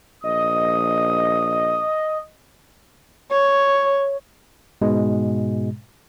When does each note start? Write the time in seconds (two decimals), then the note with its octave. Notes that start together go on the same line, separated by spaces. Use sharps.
0.24 A#1 D#5 D#6
3.31 C#5
4.81 G#2 B2 G#3